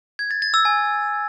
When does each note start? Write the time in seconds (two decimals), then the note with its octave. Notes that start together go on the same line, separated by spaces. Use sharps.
0.19 G#6
0.31 A6
0.42 A6
0.54 E6
0.65 G#5